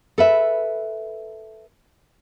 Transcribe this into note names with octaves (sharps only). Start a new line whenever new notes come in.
A4 B4 E5